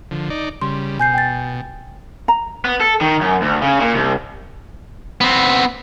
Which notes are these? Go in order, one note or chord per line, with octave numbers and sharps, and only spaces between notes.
D3 F3
D#4 D5
C#3 G3 C6
B2 G#5 G6 C7
G5 A6
A#5
B3
A4
D#3
F#2
D2
C#3
A#2
C2
B3 C4